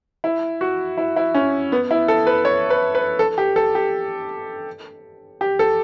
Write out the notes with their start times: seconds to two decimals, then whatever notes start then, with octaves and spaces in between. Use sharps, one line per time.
0.24 E4
0.61 F#4
0.98 E4
1.16 E4
1.34 C#4
1.72 B3
1.91 E4
2.08 A4
2.27 B4
2.45 C#5
2.70 B4
2.95 B4
3.19 A4
3.38 G4
3.56 A4
3.75 G4
5.41 G4
5.59 A4